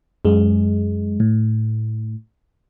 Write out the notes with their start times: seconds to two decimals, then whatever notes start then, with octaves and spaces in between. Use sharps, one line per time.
0.25 F#2 G#3
1.20 A2